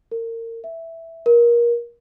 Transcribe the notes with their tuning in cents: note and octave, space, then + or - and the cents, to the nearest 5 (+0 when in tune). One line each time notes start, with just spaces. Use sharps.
A#4 -30
E5 +0
A#4 +25